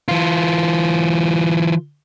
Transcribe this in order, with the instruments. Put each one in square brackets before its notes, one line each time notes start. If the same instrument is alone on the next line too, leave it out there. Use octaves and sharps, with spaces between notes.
[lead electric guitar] E3 F4